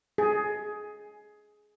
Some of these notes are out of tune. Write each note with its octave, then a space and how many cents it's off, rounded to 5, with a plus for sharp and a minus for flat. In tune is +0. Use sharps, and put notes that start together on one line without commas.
G#4 +15